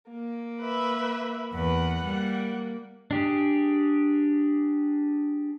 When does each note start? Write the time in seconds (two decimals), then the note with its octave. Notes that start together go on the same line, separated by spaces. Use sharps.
0.10 A#3
0.60 B4 E5
1.54 E2 B4 F#5
2.05 G3 A#3
3.11 D4 G4 G#4